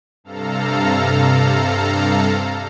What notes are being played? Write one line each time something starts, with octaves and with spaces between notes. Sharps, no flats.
G2 C3 A4 F5 A#5